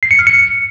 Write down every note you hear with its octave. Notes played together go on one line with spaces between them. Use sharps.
C7
C#7
F6
C#7